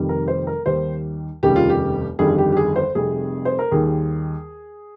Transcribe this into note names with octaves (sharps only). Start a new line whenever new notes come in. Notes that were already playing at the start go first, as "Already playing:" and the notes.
Already playing: F1 F2 D#3 G3
A#4
C5
A#4
D#2 D#3 G3 C5
F1 D#2 C#3 G3 G4
F4
G4
G1 F2 D#3 G3 G#4
G4
G4
G#4
C5
F1 F2 C3 G3 G#4
C5
A#4
D#2 D#3 G3 G#4